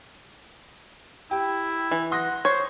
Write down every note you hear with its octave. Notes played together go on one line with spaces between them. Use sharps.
E4 G4
E3
F#5 C6 D#6 A#6
C5 C#5